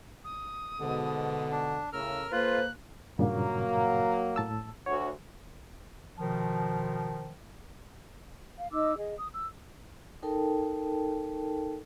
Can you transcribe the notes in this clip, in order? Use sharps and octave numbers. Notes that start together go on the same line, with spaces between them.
D#6
G#2 B2 D3
D4
A2 C#3 A#4 E6 F6
A#3 F4 A4 B4 C5 F#6
G2 A#2 C#3 F#3 A#3
A2 A5 E6
D2 F#4 C#5
B2 D#3 F3
F5
D#4 D#5 D6 E6
G#4 D#5
D#6
E6
D#4 A4 A#4 G5 A5